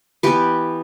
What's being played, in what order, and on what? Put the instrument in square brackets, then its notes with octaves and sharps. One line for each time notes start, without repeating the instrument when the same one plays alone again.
[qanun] E3 B3 G4 B4